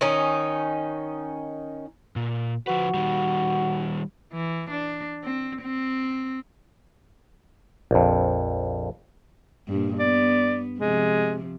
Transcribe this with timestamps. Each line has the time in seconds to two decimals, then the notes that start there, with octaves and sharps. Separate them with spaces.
0.01 D#3 C#4 D#4
2.16 A#2
2.67 F3 F#4 B4
2.94 D#3 G3
4.33 E3
4.71 D4
5.24 C4
5.62 C4
7.91 A#1 F2
9.68 G2 A#2
9.99 B3 D5
10.79 C3 F3 G#3